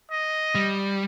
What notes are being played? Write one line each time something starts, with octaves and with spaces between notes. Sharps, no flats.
D#5
G3